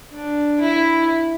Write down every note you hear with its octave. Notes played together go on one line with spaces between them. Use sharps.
D4
E4